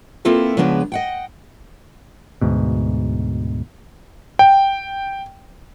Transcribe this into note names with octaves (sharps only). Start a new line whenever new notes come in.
A#3 C4 E4 F4 A4 B4
C#3 F3 G#3 B3 C#4 D4
D#5 F#5 G5
D2 G#2 B2
G5